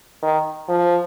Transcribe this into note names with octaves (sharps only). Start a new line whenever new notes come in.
D#3
F3